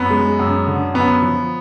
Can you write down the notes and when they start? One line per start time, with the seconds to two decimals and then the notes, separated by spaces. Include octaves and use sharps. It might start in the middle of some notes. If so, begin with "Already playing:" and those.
Already playing: F#2 B3
0.11 G#3
0.39 F#2
0.67 D3
0.94 F#2 B3
1.22 F3